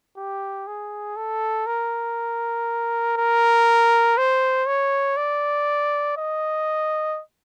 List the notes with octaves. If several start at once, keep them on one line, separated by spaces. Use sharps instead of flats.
G4
G#4
A4
A#4
A#4
C5
C#5
D5
D#5